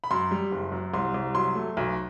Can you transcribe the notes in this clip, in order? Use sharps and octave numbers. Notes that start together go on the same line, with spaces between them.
B5
F#2 C6
G3
F#1
F#2
C2 C6
C2
F#3 C6
A3
B1